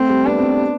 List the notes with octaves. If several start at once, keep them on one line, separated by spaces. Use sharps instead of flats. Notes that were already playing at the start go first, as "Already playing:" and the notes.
Already playing: A3 C4
G3
B3 D4
C4
B3